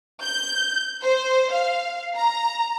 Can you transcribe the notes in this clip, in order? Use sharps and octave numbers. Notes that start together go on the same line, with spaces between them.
G6
C5
F5
A#5